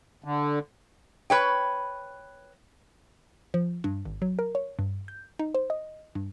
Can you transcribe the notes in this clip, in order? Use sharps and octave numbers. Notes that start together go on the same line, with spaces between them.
D3
B4 C#5 G5
F3
G2
G#1
F#3
A#4
C#5
G2
G6
D#4
C5
D#5
G2